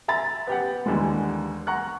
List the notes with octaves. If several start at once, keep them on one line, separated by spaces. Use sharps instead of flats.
E5 A#5 B5 A6
B3 G4 F#5
D#2 D3 E3 G3 G#3
F#5 A#5 C#6 F#6